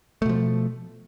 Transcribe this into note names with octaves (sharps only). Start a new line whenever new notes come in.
B2 F3 A3